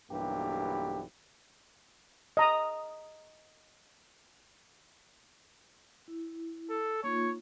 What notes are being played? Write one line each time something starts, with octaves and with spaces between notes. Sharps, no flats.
B1 G2 E3 A#3 G4
D#5 A#5 D#6
E4
A4
A#3 D#4 F4 C#5